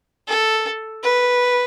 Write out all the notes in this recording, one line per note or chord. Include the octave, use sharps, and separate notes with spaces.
A4
B4